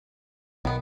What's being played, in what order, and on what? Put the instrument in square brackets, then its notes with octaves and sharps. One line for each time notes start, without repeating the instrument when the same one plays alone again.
[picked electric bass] B1 [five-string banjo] D#3 B3